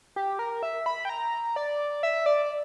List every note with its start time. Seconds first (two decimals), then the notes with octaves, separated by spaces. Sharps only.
0.16 G4
0.39 A#4
0.63 E5
0.86 B5
1.05 G5
1.09 A#5
1.56 D5
2.03 E5
2.26 D5